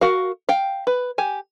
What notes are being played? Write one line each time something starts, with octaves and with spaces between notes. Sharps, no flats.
F#4 A#4 F5
F5 G5
B4
G4 G#5